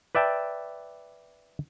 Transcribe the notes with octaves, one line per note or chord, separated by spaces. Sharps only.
B4 D5 E5 G5 A5